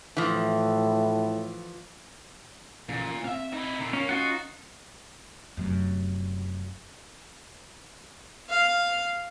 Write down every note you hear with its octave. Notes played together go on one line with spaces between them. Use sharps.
A2 E3 F3
A#1 A#2 C#3 E3
C4 E5 F5
D#4 E4
A#2 D3
A#3 C#4
C#4 D#4 F4 F#4 F#5
F1 F#2
F5